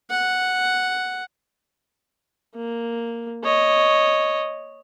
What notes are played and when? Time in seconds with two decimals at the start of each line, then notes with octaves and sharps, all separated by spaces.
0.11 F#5
2.56 A#3
3.44 C#5 D#5